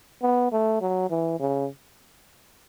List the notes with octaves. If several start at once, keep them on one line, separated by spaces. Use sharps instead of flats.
B3
A3
F#3
E3
C#3